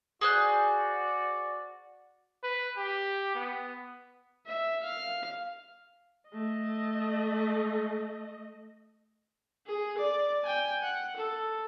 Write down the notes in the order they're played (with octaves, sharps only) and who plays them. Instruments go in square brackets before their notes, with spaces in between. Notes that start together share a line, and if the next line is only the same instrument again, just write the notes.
[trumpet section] F#4 D5 [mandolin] G#4 C5 F#6
[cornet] B4
G4
B3
[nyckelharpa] E5
F5
[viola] A3 D#5
G#4
D5
G5 G#5
F#5
A4